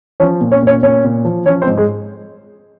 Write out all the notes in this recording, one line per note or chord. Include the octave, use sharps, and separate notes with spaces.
F3 C#4 C#5
A#2
C#4 C#5
A#2 C#4 C#5
A#2 C#4 C#5
A#2
F3
F3 C#4 C#5
C4 C5
G#2
G#3 G#4